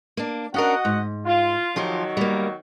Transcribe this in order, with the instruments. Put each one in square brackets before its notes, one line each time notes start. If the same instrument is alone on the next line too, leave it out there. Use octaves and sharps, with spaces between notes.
[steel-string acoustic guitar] A#3 D4
[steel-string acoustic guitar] C#4 D4 A#4 [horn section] F#4 D#5 F#5
[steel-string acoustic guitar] G#2
[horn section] F4
[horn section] D#3 F#3 [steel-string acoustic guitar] F3 F4 G4
[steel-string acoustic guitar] G3 A#3